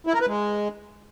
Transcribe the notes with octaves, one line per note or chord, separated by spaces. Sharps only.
E4
A#4
B4
G#3